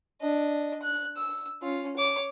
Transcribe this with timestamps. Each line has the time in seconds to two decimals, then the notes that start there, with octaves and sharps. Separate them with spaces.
0.22 D4 D#5
0.83 F#6
1.16 E6
1.62 C#4 F4
1.97 C#5 D6